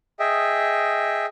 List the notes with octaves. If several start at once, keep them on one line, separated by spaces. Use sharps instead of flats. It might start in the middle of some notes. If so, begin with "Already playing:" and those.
G#4 D#5 E5 G5